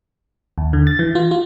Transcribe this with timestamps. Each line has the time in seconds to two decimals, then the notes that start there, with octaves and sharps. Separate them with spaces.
0.58 D#2
0.73 D3
0.87 A6
0.99 E3
1.15 F4
1.31 F4